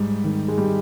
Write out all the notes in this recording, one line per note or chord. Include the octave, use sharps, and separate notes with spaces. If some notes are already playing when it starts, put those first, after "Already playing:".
Already playing: G#2 G3
D#3
G#3
G3